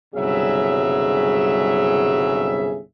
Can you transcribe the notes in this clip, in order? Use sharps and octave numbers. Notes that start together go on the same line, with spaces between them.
G1 C2 C#3 F#3 G#4 E5